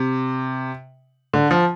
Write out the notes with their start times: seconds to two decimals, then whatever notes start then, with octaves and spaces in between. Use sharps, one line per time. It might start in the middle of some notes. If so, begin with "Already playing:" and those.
Already playing: C3
1.34 D3
1.51 F3